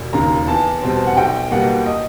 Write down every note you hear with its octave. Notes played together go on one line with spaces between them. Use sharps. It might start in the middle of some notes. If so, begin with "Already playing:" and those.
Already playing: E1
D#2 C#3 A#5
E2 A5
B2 G3 C4
F#5
B1 G5
B2 G3 A#3 F#5
D#5